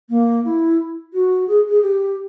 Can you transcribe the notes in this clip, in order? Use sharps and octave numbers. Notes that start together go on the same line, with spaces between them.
A#3
E4
F#4
G#4
G#4
G4